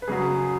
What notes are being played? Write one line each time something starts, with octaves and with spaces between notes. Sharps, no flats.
B4
F#2 C#3 F#3 G#4